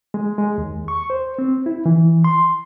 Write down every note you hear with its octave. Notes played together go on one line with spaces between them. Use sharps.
G#3
G#3
D#2
C#6
C5
C4
E4
E3
C6